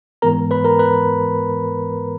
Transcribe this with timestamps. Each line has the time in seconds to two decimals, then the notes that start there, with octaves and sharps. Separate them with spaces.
0.22 G#2 E3 G#3 B3 A#4 A#5
0.51 B4 B5
0.64 A#4 A#5
0.79 B4 B5